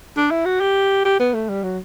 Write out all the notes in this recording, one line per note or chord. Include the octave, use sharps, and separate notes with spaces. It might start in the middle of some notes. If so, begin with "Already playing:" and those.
D4
E4
F#4
G4
G4
B3
A3
G3
F#3